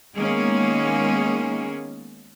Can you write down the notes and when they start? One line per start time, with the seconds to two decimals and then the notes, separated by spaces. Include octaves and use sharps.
0.17 D#3 G#3 A#3 B3 C#4 G#4